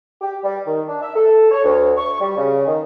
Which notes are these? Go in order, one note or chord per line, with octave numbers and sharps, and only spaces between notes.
G4
G3
D#3
D4
E5
A4
C#5
D2
C#6
G3
C#3
D#3